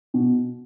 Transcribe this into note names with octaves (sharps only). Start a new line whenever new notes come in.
B2